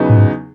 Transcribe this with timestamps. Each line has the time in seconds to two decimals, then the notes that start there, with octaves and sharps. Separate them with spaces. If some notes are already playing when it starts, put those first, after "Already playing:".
Already playing: E2 C#3 F#3 B3 D#4
0.09 A2
0.18 G#2